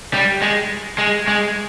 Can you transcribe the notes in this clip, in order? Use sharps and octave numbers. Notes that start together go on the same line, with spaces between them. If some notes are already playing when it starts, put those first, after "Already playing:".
G3
G#3
G#3
G#3